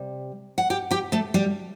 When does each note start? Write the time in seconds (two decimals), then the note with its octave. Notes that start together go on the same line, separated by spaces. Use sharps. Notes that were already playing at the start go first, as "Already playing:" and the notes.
Already playing: C3 G3
0.58 F#5
0.70 G4 G5
0.91 G4 G5
1.12 A3 A4
1.34 G3 G4